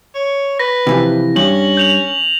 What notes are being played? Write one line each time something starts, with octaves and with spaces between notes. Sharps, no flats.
C#5
B4 A#6
C3 E3 F3
G2 C#4 F#7
G6 F7 F#7